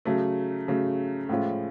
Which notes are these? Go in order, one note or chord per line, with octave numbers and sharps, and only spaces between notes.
C#3 F#3 A3
C#3 F#3 A3
A2 F3 G#3 C#4 F4